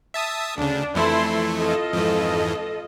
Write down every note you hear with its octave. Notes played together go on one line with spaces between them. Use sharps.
E5 A5 D#6
D2 C#3 D4
F2 E3 A3 E4 A4 C6
F4 A4 D#5
F2 G#2 E3